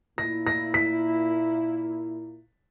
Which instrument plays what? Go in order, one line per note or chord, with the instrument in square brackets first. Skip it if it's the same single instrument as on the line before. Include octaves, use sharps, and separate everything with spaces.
[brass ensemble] A#2 A#3 E4 [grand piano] A#6
[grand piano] A#6
B6